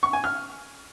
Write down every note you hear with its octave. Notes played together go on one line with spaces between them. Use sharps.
C#6
G#5
F6